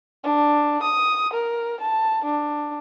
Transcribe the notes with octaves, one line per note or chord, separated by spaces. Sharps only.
D4
D#6
A#4
A5
D4